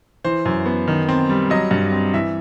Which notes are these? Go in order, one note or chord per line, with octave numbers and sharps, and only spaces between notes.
E3 C5
F#2
B3
D#3
C4
G3
F#3 D#5
G2
C4
E3 E5